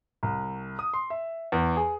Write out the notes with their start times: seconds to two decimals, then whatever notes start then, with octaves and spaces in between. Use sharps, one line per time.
0.23 C2
0.79 D#6
0.94 C6
1.10 E5
1.52 E2
1.77 G#4